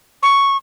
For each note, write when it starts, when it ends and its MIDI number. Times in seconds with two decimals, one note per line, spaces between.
0.23 0.57 85